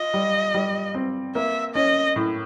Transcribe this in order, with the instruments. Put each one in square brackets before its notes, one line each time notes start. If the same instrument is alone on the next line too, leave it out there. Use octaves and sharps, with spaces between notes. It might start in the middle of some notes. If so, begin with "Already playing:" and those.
Already playing: [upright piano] F4 [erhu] D#5
[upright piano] G3
G3
C4
[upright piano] A#3 [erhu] E5
[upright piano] C#4 [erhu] D#5
[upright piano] A2